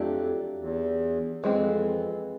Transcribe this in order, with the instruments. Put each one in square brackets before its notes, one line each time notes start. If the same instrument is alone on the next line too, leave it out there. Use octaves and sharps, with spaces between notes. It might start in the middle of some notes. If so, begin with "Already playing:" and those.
Already playing: [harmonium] F2 [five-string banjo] F#3 A3 D4 G4
[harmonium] E2
[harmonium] F2 [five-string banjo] E3 G#3 C4